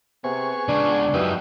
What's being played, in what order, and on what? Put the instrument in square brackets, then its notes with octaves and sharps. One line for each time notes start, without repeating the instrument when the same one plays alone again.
[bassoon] C3 [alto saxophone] B3 [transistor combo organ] G#4 C#6
[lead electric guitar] C#2 C#3 [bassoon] D4
[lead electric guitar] F#2 [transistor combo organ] D#4 E4 G4 [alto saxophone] B4